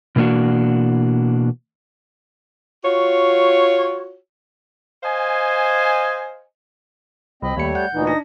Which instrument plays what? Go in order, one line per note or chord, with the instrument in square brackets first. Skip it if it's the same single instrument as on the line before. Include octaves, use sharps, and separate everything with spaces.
[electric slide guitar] B2 E3 A#3 D4 F#4
[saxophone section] F4 F#4 C#5
[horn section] C5 D#5 F5 G#5
[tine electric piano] C2 [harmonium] C4 D#5 [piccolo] B5
[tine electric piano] D#2 C#7 [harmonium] G3 A3 C#5
[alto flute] D5 [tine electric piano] F#5 [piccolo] G6
[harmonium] D2 A#2 E3 [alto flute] D#4
[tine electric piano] D4 [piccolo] A#6